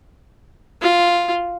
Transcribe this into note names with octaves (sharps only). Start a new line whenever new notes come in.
F4